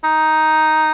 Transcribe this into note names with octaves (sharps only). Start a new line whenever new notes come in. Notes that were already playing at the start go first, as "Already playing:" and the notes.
D#4